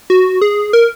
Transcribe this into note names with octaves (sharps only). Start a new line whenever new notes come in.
F#4
G#4
A#4